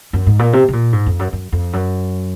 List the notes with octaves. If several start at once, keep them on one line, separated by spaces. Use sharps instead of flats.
F#2
G#2
A#2
C3
C3
A#2
G#2
F2
F#2
F#2
F2
F#2